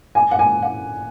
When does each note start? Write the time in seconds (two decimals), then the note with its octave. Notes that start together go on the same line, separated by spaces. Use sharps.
0.15 G#5
0.31 F#5
0.39 G#5
0.63 F#5